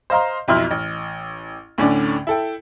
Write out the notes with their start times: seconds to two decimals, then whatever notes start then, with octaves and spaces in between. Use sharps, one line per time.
0.10 C5 D#5 F5 A#5 C6
0.48 B1 F2 B2 E4 C6 F6
0.71 A1
1.78 D2 A2 D3 C#4 D4 D5
2.27 E4 A4 G5